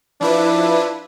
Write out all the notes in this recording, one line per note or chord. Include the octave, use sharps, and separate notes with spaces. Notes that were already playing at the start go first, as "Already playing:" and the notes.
F3 D4 E4 B4